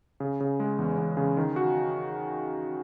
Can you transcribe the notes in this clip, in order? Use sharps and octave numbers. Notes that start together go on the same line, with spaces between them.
C#3
C#3
G#3
E2
E2
C#3
D#3
F#4